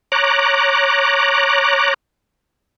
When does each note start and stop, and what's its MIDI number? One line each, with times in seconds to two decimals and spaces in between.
0.12 1.94 73
0.12 1.94 82
0.12 1.94 86
0.12 1.94 90